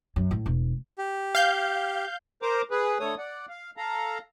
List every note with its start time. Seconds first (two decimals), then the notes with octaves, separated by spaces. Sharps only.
0.16 F#2
0.31 A2
0.46 E1
0.98 G4
1.35 F5 G6
2.42 A#4 C5 A#5 D6
2.71 G#4 B4
3.00 D3 A3 A4 C#5 D#6
3.18 D5 F#5
3.49 F5
3.77 A4 F5 A#5